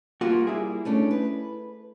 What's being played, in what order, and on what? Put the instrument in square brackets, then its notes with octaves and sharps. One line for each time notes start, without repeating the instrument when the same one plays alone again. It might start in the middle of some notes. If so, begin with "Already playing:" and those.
[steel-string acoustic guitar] G3 A#3 [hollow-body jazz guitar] F4 F#4
[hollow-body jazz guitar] E4 G#4
[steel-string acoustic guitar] A3 C#4 D4
B4